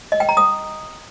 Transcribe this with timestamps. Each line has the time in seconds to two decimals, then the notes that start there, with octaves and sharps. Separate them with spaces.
0.12 D#5
0.20 G5
0.29 A#5
0.37 D#6